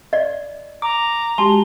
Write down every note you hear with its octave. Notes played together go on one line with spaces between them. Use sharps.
D5 D#5
A#5 D6
G#3 F#4 G4 A5 C6